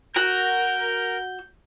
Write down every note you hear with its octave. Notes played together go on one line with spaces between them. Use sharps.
F#4 A#4 G6